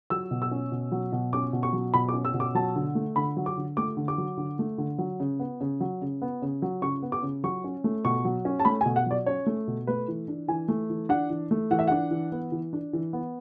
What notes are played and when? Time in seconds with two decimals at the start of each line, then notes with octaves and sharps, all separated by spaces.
0.10 F#3 E6
0.31 B2
0.42 E6
0.51 C#4
0.72 B2
0.92 F#3
1.12 B2
1.33 C#4 D6
1.53 B2
1.63 C#6
1.73 F#3
1.94 B2 B5
2.09 D6
2.14 C#4
2.25 E6
2.34 B2
2.40 D6
2.55 F#3 A5
2.76 D3
2.95 A3
3.16 D3 B5
3.37 F#3
3.46 D6
3.57 D3
3.77 A3 D6
3.97 D3
4.08 D6
4.18 F#3
4.37 D3
4.59 A3
4.78 D3
4.99 F#3
5.20 C#3
5.40 B3
5.61 C#3
5.80 F#3
6.01 C#3
6.22 B3
6.42 C#3
6.62 F#3
6.82 C#3 C#6
7.02 B3
7.12 D6
7.22 C#3
7.44 F#3 C#6
7.64 C#4
7.84 A3
8.05 B2 C#6
8.25 F#3
8.45 C#4
8.60 A5
8.65 A3 B5
8.81 G#5
8.85 B2
8.96 F#5
9.06 F#3 D5
9.26 C#4 C#5
9.46 A3
9.68 B2
9.87 A3 B4
10.08 E3
10.28 D4
10.48 E3 G#5
10.68 A3
10.90 E3
11.09 D4 F#5
11.30 E3
11.51 A3
11.71 E3 F#5
11.79 E5
11.88 D4 F#5
12.11 E3
12.32 B3
12.52 E3
12.73 D4
12.93 E3
13.13 B3